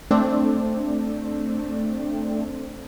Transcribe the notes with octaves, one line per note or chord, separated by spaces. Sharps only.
A3 C4 D4